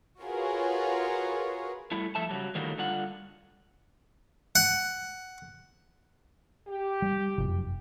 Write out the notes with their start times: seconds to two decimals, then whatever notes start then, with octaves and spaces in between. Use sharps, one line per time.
0.21 F4 F#4 G#4 A#4 B4 C#5
1.91 G3 A3 E4
2.15 F3 A3 E5 A5
2.29 C#3 F#3 G3
2.55 A2 D3 D#3 F#3 G3 A#3
2.78 D3 G3 F4 F#5
4.55 F#5
6.68 G4
7.02 G3
7.38 F1 F#2